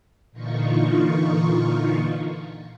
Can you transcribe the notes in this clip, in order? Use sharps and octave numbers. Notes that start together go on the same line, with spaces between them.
A#2 D3 E3 D#4 F4 C#6